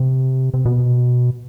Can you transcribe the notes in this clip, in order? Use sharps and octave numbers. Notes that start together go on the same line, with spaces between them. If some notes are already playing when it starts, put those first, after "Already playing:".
Already playing: C3
C3
B2